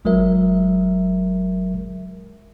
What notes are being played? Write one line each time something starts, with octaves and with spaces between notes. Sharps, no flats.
G1 F#3 G#3 A#4 E5